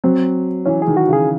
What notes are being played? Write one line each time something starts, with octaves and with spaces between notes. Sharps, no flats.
F#3 C4
E3 C#4
G#4
D#3
F#4
C#3
G#4